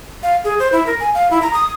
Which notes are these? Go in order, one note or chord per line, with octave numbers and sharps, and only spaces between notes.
F5
G#4
C5
E4
A#4
G#5
F5
E4
A#5
D#6